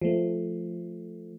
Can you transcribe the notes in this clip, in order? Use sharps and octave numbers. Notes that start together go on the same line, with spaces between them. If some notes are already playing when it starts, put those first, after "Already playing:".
F3 A3